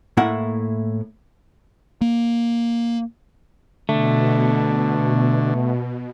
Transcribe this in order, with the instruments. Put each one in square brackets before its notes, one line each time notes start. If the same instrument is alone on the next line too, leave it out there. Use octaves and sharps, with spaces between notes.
[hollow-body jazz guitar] A2 A#3 E4 F#5
[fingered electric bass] A#3
[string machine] B2 [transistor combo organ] D3 [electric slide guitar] A3